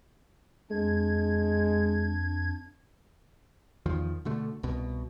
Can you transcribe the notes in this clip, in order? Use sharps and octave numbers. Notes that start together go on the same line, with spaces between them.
F2 G#3 D4 G#6
E2 D#3 F3
B2 D3 A3
C2 B2